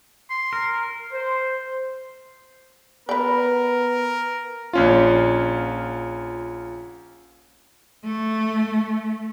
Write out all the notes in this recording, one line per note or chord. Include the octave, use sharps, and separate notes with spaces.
C6
A#4
C5
B3 A#4 B4 D5
A#1 C#4 F4
A3